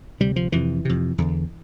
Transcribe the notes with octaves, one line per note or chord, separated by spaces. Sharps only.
D2 C3 G3
F3
F2 C3 E3
F2 C3
E2 D3